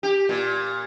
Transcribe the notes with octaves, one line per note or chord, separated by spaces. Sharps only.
G4
A#2